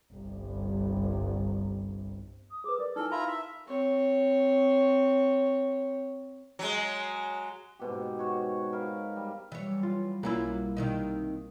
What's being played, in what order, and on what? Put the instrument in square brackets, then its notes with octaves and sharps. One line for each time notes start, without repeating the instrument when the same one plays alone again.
[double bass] G1 C2
[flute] D#6
[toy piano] G#4 B4 [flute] D6
[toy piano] A#4 [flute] D5
[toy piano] D#4 E4 G#5 [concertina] A4 [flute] F6
[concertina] E4 F4 A#5 [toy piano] A5
[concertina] E5
[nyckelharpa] C4 C#5
[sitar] F#3 G#3
[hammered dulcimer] G#2 B2 G4
D#4
F#4 C#5
A#4 B4 D#5 F5
G3
[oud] E3 C#5 [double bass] F#3 G3
[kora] F4
[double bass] B1 G3 [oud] F#3 C#4 F4 [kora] A#3 E4
[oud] C3 D#3 D#4